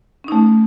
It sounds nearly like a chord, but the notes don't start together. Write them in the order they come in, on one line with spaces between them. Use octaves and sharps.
C#4 D#4 A3